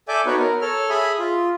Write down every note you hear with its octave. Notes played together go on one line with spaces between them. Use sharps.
A4 D5 E5 G#5 D6 G6
B3 D#4 F#4 B4 C#5
A#4
A4 C#5 F6
G#4 E5 G#5 B5 D#6
F4